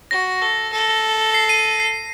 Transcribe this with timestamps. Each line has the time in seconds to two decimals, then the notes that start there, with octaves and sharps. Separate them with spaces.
0.11 F#4 A#6
0.42 A4
0.73 A4
1.34 C7
1.49 C7 D#7
1.80 C7